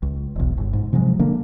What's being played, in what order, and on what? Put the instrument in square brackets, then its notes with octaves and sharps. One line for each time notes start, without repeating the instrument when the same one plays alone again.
[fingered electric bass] C#2
E1 B1
G1
G#2
C3 F3 F#3 G#3
D3 A#3 D4